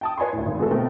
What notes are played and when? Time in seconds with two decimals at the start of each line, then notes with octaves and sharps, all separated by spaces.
0.01 G5 A5 D#6
0.18 B4 C#5 G#5 B5 C6
0.33 D2 A2
0.46 G#1
0.58 D3 G#3 B3 F#4 G#4 A4
0.71 B2 A3 C4 A#4 G5